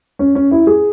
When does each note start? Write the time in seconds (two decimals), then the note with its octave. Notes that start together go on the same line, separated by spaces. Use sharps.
0.19 C#4
0.35 C#4
0.51 E4
0.67 G#4